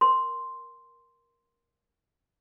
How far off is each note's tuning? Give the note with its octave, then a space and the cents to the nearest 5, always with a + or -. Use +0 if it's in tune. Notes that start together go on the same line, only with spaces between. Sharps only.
A#4 +10 C6 +0